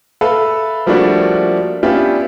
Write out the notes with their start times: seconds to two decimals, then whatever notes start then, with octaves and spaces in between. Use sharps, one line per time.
0.21 A4 B4 E5 F5
0.87 F3 G3 A3 A#3 D4 F#4
1.83 B3 C#4 D4 E4 F4 G4